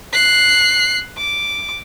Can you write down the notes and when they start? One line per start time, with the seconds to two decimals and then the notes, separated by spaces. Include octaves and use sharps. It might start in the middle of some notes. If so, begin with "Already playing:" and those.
0.13 F#6 C7
1.18 D6